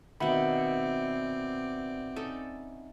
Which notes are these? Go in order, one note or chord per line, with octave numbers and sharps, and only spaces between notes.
B2 D#3 C4 D5 E5 F#5 B5
C#4 D#4 A4